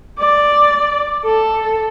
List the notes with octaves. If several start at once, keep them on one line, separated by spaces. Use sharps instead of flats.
D5
A4